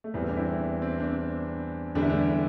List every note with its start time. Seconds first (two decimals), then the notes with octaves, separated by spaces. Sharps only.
0.04 A3
0.14 E2 E3 G3 C4
0.29 D4
0.37 C4 E4
0.82 C4
1.00 D4
1.04 C4
1.95 E2 D3 G3 D4
2.02 E4
2.10 A3 D4